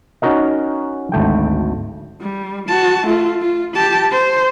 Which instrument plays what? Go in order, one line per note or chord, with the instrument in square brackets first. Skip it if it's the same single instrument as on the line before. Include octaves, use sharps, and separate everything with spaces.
[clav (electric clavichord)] C#4 D#4 F#4 A#4 D#5
G#1 D2 A3 G5
[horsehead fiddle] G3
F#4 A5
A3 F4
F4
G4 A5
C5